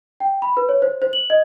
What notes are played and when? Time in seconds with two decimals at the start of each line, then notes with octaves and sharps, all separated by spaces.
0.20 G5
0.42 B5
0.57 B4
0.69 C#5
0.82 C5
1.02 C5
1.13 F#7
1.30 D#5